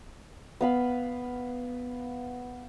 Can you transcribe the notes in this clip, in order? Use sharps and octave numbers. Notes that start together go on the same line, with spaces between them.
B3 F5 B5